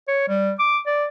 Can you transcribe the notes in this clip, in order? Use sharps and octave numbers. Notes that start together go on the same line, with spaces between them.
C#5
G3
D6
D5